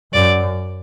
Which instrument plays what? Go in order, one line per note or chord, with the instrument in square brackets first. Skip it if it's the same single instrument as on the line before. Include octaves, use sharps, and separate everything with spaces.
[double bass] F#2 [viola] D5